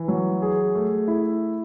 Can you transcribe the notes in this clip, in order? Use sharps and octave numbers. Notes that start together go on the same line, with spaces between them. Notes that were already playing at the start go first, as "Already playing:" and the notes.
Already playing: E3
F#3
G#4
A3
E4